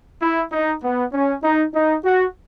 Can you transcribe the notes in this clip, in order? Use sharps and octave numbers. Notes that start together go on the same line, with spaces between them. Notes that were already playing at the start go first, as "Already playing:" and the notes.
E4
D#4
B3
C#4
D#4
D#4
F#4